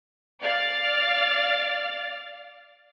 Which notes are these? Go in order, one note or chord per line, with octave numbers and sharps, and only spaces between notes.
D5 F5 F6 A6